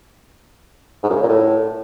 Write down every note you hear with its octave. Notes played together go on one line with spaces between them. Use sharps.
G#2
F#2
C#3
A#2
A2